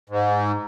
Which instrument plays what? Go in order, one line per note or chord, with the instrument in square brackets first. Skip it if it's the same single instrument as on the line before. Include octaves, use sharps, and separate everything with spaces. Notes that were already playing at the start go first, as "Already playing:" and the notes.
[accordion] G#2